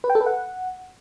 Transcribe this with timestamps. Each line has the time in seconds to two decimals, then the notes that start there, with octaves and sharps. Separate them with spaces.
0.04 B4
0.10 G5
0.15 A4
0.21 B4
0.26 F#5